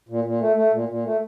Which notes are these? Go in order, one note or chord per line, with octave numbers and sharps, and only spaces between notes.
A#2
A#2
A3
A3
A#2
A#2
A3